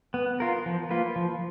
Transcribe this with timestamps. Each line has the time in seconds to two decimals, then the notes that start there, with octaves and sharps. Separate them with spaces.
0.14 B3
0.40 F4 A#4
0.66 F3
0.90 A#3 F4 B4
1.16 F3